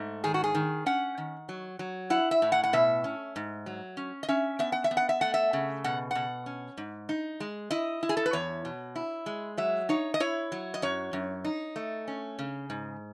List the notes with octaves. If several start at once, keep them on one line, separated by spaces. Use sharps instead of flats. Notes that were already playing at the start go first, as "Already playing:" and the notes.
Already playing: G#2 A3
D#3 G#4
F#4
G#4
D#3
C#4 F#5
D#3
F#3
F#3
E4 F#5
E5
A2
F#5
F#5
B2 E5
C#4
G#2
F#3
C#4
D#5
C#4 E5
B3 E5
F#5
E5
B3
F#5
E5
A3 F#5
E5
C#3
B2 F#5
B2 F#5
C#4
G#2
D#4
G#3
E4 D#5
E4
G#4
A4
B4
E2 C#5
B2
E4
G#3
F#3 E5
D#4 C#5
D#5
E4 C#5
F#3
D#5
F#2 C#5
F#2
D#4
A3
C#4
C#3
G#2